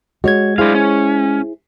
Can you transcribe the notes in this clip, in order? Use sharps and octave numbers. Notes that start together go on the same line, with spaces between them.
G#3 F#4 C#5 G#6
D4 E4 G#4 C5 F5
C#4